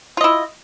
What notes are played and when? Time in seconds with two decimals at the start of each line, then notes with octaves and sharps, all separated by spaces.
0.17 F4
0.21 D#5
0.24 E4